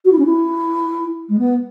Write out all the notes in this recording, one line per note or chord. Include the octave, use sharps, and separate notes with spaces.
F#4
E4
C#4
E4
G#3
B3